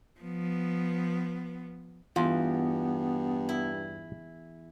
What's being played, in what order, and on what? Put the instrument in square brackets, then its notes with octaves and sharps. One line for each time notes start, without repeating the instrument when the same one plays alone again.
[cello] F3 B3
[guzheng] E2 [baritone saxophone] G2 [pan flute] B3 [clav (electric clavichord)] F4
[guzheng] E4